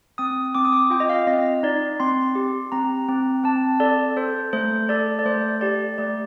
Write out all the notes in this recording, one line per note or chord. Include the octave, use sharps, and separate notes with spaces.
C4 D#6
C4 D6
D#6
D6
F4 G5
D#5
F5
C4 D#5
D#4 D5
C4 C6
G4
C4 A#5
C4
C4 A5
A4 D5
A4 C5
A3 C5
A4 D5
D5
A3 C5
G4 D5
A3 D5